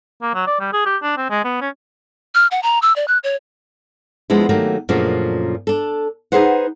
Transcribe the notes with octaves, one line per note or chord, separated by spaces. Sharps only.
A#3
F#3
D5
G3
G#4
G4
D4
C4
G#3
B3
C#4
F6
F#5
A#5
E6
D5
F#6
C#5
F3 G#3 B3 D4 E4
D#3 F#3 A3 A#3 G4
F#2 A#2 C#3 F3 A3 D4
D4 A4
D#4 E4 G#4 B4 C5 F#5